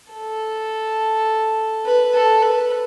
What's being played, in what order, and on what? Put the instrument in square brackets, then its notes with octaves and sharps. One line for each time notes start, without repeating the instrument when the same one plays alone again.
[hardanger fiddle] A4
B4
A4
B4